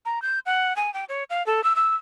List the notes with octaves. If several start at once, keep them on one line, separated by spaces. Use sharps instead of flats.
A#5
G6
F#5
G#5
G5
C#5
F5
A4
E6
E6